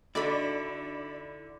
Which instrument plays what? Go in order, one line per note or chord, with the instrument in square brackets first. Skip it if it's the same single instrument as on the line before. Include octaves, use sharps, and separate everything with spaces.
[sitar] D3 [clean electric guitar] D#4 E4 [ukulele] F#4 A4 D#5 [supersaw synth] D5 B5